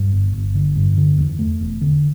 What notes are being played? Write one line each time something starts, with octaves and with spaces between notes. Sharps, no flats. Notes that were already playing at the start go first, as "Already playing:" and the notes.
Already playing: G2
G1
G1
D3
G2
D3
E2
A3
E1
D3